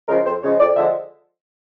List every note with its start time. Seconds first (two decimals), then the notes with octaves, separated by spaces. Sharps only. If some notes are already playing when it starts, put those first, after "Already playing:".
0.08 C#3 F3 G#3 A#4
0.25 F2 C5
0.42 C#3 F3 G#3 C#5
0.59 F2 D5
0.76 D3 F3 G#3 E5